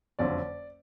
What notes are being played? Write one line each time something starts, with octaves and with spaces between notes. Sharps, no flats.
F#1 F2 D3 F#3 D5